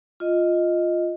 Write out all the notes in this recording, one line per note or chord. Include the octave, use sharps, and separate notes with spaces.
F4 D#5